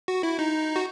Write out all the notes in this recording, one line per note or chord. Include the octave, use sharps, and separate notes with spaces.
F#4
E4
D#4
F#4